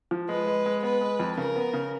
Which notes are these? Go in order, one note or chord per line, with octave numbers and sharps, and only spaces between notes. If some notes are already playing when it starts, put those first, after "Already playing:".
F3
G#3 B4
G#3
G#3
B3 B4
G#3
F2
C#3 A#4
B3
C#3